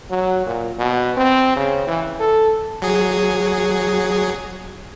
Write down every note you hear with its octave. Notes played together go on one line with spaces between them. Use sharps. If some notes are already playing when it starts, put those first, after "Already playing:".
F#3
A#2
B2
C4
C#3
E3
A4
F#3 G#4